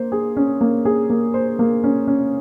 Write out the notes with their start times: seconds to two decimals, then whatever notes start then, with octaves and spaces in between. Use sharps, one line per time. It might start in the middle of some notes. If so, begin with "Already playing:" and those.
Already playing: A#3 C5
0.12 G#4
0.37 C#4
0.61 A#3
0.85 G#4
1.10 A#3
1.34 C5
1.59 A#3
1.84 C#4
2.08 C#4